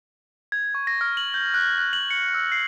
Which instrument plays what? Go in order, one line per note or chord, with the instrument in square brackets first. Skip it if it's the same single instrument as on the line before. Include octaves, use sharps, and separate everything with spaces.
[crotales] G#6
C#6
A#6
F6
F#7
G6
F#6
F#6
F#7
C#7
E6
C7